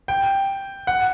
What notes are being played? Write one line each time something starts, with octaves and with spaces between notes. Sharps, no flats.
G5
F#5